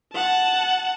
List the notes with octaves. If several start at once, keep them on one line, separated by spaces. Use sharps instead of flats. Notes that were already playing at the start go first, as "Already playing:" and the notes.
F#5 A5